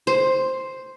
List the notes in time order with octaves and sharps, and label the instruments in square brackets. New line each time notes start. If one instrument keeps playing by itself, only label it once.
[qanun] C5